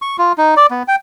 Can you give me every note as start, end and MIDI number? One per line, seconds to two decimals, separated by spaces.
0.02 0.17 85
0.18 0.32 65
0.38 0.55 63
0.56 0.66 74
0.71 0.83 59
0.88 0.96 79